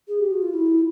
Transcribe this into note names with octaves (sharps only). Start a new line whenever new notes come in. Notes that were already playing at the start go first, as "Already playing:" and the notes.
G#4
G4
F#4
F4
E4